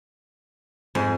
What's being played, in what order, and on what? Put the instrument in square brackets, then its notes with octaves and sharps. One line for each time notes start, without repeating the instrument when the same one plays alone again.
[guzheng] F2 [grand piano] G#2 C5 G#5